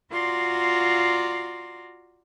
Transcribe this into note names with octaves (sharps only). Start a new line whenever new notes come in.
F4 F#4 D5 A#5 C6